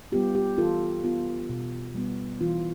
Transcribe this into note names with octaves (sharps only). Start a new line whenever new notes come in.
G3 B3 F4 G4
G4
E3 F4 A4
B3 F4
B2
G3 B3
E3 F4